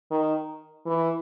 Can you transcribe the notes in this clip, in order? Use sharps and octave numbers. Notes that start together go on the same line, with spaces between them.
D#3
E3